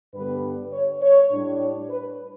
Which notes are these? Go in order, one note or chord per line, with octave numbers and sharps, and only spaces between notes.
G2 D3 G3 B3 B4
C#5
C#5
A2 G3 D4
C#5
B4